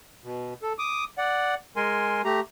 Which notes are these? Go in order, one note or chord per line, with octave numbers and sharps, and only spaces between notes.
B2
A4
D6 D#6
D5 F#5
G#3 A#4 G#5 C6
A3 G4 A#5